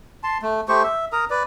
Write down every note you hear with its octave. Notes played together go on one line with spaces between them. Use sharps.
A5 C6
A3
A3 G4 C5 C#6
E5
A#4 A#5 D#6
B4 D5